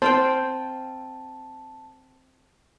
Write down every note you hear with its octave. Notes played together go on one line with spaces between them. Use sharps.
C4 C5 F5 G5 A5